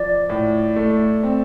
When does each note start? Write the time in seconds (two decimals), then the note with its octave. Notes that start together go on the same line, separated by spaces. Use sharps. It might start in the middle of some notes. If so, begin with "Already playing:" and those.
Already playing: F3 D5
0.29 A2
0.76 A3
1.23 C4